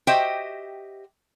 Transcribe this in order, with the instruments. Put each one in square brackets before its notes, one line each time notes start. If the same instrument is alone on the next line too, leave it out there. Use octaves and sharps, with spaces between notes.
[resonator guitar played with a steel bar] F#4 G4 C5 D#5 E5 G5